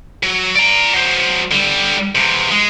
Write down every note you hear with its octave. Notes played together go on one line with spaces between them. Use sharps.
F#3
D5 A#5
F#3 C5
D3 G3
E2 C3
G#3